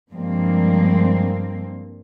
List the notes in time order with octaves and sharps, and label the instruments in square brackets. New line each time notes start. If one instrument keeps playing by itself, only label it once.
[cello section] G2 F3 G#3 A#3 C4